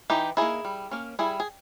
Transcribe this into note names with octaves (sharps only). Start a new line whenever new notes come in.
E3 D#4 G4
A#3 D#4 E4 G#4
G3
A#3 C#4
G3 E4 G#4
G#4